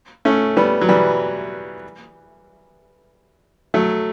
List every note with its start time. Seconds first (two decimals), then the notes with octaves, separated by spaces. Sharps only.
0.25 A3 C#4
0.57 G3 B3
0.81 F#3
0.89 E3 G3
3.74 F#3 A3